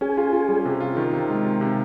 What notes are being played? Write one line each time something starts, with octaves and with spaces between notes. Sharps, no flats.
C#4 G#4
F4
F4
G3
C3
F4
D#3
C3
G#3
C3
C3